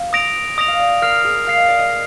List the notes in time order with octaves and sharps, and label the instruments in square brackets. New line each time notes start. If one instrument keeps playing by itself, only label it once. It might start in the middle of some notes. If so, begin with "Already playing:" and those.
Already playing: [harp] F5
[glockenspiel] D#6 A#6 D7 F7
[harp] D#5 [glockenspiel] D#6 A#6 D7 F7
[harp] F5
D5
[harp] A#4 [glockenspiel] F6 C7 F7
[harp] G#4
[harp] F5 [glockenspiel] F6 C7 F7
[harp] D#5
D5
D#5